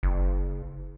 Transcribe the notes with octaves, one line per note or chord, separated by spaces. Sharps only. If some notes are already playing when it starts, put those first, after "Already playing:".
F#1